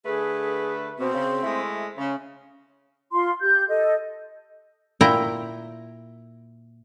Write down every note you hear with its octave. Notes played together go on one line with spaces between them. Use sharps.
D3 A3 G#4 B4
B2 C4
C#3
G#3 A3 E4
C#3 C#4
F4 C6
G4 G6
A4 D#5
A#2 E4 G5 A#5